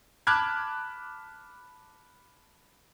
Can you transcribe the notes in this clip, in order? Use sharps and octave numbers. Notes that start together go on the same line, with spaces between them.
A5 B5 D6 F6 F#6 G#6